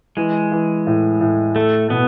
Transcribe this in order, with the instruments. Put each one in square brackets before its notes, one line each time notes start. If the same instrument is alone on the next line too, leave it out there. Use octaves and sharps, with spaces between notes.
[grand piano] E3 [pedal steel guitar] G#3
[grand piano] E3
A2
A2
[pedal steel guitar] A3 [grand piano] A4
[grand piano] B2 [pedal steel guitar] B3